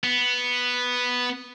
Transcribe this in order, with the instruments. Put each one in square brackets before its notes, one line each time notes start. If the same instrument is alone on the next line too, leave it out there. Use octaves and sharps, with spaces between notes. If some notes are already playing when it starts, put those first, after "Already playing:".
[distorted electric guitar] B3